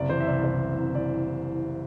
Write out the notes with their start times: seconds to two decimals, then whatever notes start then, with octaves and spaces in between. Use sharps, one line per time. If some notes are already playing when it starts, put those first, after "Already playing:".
Already playing: F#1 C3 D5
0.10 E3 C5
0.20 E5
0.27 C2 D5
0.44 C2 C5
0.61 C3
0.78 C2
0.95 E3 D5